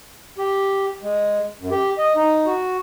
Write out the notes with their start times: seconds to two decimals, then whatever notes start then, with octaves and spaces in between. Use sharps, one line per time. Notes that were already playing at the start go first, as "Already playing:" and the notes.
0.38 G4
1.02 G#3
1.59 F#2
1.71 G4
1.98 D#5
2.16 D#4
2.46 F#4